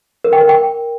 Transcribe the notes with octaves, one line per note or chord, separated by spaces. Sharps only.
A#4
G5
A#4
G5